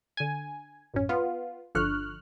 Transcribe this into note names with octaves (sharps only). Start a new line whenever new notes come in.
D3 G#5
A1 F#2 C#4
B3 F4
G1 D3 F3 C#6 F6 F#6